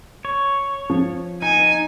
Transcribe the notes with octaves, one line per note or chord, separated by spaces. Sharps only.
C#5
F3
D#4 G#5